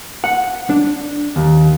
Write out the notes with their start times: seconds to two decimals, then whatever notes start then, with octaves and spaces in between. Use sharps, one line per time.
0.24 F#5
0.70 D4
1.36 D#2